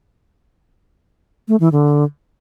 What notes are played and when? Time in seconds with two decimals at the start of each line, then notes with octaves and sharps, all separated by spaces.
1.48 A3
1.60 E3
1.72 D3